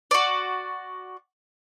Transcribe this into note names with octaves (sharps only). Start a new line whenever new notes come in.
F#4 D5